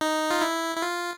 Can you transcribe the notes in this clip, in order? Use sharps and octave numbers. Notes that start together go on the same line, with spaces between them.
D#4
F4
E4
E4
F4